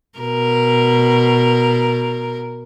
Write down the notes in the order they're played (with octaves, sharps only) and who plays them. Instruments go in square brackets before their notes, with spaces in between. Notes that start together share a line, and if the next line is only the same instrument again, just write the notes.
[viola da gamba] B2 A#4